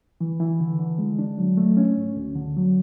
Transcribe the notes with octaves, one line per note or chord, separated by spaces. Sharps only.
E3
E3
D3
D3
G#3
D4
F#3
A3
C#4
G#2
D2
D3
F#3